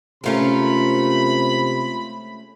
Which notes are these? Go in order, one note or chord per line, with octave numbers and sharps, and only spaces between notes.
C3 G#3 A3 C#4 F4 A#4 B5